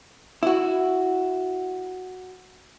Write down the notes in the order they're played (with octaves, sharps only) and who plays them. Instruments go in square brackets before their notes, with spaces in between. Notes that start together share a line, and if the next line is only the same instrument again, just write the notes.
[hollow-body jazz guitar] E4 F#4